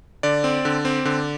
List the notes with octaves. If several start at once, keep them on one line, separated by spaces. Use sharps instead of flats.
D3 D5
C4
D3
C4
D3